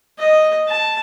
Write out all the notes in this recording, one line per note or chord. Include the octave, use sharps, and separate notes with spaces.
D#5
A5